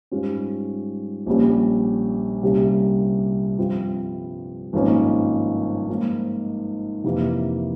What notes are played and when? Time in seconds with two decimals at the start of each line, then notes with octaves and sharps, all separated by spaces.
0.11 G#2 G3 C#4 F4
1.26 A#1 A#2 G3 C#4
2.43 C2 C3 G3 A#3 C#4
3.58 G2 F3 C4 F4
4.73 G#1 G2 F3 A#3 C#4
5.88 G#2 F3 A#3 F4
7.04 F2 C3 E3 A#3